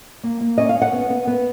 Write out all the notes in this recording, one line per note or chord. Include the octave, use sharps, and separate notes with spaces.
A#3
A#3
C#4 D#5
F5
C#4
F#5
B3
B3
B3